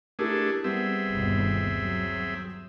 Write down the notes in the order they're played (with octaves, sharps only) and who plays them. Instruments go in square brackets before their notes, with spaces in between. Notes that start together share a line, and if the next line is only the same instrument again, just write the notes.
[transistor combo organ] A3 D4 G#4 [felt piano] E4 G4 A#4
[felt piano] G3 B3 [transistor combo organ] C4 G#4 E5
[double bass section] G1 D#2 B2
F#3